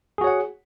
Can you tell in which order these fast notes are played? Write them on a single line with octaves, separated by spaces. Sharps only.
G#4 F#4 C#5 F#5